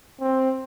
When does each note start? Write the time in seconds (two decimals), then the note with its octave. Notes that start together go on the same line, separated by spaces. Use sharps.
0.20 C4